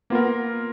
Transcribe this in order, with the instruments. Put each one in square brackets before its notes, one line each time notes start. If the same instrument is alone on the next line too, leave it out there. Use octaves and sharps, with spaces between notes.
[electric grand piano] A#3 F4 A#4 [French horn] B3